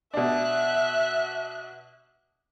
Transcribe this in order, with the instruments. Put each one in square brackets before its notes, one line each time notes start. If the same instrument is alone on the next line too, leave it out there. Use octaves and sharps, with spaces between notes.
[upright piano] B2 D4 [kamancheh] E5 F#6